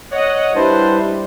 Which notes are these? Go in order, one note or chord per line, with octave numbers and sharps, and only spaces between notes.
C#5 D#5 F#5
G3 D4 E4 B4 C5